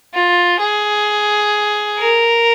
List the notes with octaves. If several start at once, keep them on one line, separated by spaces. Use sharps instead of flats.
F4
G#4
A#4